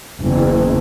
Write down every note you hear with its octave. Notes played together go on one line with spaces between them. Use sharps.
F#1 E2